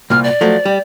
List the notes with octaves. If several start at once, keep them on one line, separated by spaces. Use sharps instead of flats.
C2 A#2 F6
D5
F3 F#3 A3
G3